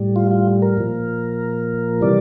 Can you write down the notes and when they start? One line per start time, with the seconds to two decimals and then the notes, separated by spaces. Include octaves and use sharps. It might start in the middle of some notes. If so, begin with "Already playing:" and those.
Already playing: A2 G3
0.16 F4
0.31 F4
0.62 A#4
0.77 A#2 F3
2.01 C3 E3 G3 D5